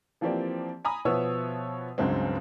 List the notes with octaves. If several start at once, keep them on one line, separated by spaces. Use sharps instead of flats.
E3 F3 A#3 C4 G4 D5
G#5 A#5 B5 D#6
B2 F3 B3 C#5 E5 E6
C#2 G2 C#3 F#3 G#3 C4